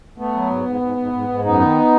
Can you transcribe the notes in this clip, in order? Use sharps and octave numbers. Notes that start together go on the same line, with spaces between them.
A3 B3
F#3
G#2
G#2
G#2
G#2
G#2
G#2
F#2 B3 D#4
D#3